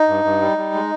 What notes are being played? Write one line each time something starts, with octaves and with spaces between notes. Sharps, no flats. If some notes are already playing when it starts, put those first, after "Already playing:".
Already playing: D#4
G2
G2
G3
G3
G#3